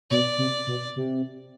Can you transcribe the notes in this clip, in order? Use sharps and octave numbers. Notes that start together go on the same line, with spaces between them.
B2 D5
C3
B2
C3